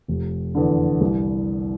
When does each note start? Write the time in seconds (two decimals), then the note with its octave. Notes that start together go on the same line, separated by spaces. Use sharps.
0.08 F1
0.55 E2 D3
1.01 C2